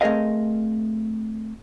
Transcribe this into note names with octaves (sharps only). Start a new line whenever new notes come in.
A3 C4 G#4 A#4 D#5 F5